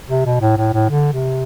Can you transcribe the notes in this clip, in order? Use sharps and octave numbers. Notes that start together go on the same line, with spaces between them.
C3
B2
A2
A2
A2
D3
C3